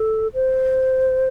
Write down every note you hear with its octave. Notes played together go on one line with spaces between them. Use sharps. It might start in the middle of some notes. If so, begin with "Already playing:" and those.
Already playing: A4
C5